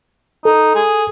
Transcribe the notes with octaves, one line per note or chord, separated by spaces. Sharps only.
D#4 A4
G#4